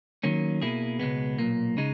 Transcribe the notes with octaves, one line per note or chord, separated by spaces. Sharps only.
D#3 F#3 A#3 C#4
B2 A#3 E4 G#4
C#2 B2 G#3 B3
B1 A#2 A#3
C#3 G#3 D#4